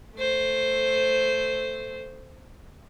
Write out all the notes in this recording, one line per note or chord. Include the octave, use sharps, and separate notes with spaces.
A3 C5